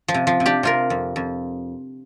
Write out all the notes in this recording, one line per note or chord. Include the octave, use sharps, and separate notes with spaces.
F3
C3
F3
C3
D4 G4
C3 F4 A#4
F2
F2